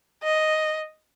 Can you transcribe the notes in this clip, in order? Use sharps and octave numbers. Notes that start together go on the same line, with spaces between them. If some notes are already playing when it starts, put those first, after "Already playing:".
D#5